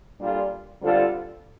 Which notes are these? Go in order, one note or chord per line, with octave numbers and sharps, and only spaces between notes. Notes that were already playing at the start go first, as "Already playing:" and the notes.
A#2 G3 D4 F4 A4
D3 G3 C4 F4 A4